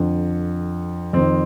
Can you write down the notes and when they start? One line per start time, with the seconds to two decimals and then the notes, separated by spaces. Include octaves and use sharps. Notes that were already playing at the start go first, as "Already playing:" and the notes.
Already playing: F2 D3
1.13 F2 D#3 C4